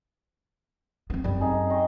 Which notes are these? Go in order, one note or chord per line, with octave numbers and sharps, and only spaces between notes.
B3 C4
F#2 G3 C4
D#4 G#4
D#5 G5 C#6